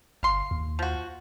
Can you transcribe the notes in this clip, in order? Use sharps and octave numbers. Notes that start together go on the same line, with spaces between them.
G1 F5 C6
D#2
F3 F#4